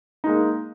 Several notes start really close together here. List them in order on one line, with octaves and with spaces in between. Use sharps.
D#4 G#3 A#3